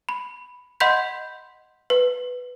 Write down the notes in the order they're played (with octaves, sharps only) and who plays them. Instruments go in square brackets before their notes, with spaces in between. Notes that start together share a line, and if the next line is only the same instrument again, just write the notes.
[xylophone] B5
D#5 F#5 B5 C6 G6 B6
B4